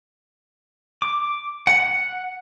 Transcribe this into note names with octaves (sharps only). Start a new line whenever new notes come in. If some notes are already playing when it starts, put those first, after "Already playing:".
D6
F#5
F#5